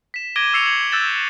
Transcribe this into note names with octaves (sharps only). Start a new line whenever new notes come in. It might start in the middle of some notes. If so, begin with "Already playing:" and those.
B6 E7
D6 G#6 A#6 D7 D#7 G7
C#6 E6 C7 C#7 F7
G#6 C#7 F#7
E6 F#6 G6 A6 E7 G7